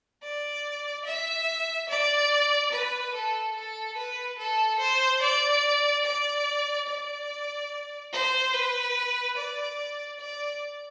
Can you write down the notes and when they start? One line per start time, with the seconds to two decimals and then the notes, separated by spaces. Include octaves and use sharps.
0.23 D5
1.05 E5
1.89 D5
2.72 B4
3.13 A4
3.56 A4
3.97 B4
4.38 A4
4.79 C5
5.22 D5
6.05 D5
6.88 D5
8.12 C5
8.53 B4
9.37 D5
10.20 D5